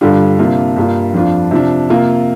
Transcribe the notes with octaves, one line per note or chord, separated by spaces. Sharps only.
G2 D3 G3 D4 F4
C3 A#3 D4 F4
G2 G3 A#3 F4
F2 F3 D4 F4
C3 F3 D4
C3 A#3 F4